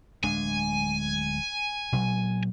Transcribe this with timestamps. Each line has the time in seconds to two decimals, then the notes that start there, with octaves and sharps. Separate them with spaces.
0.23 D1 G#3 D4 G#5
1.92 A#2 F#3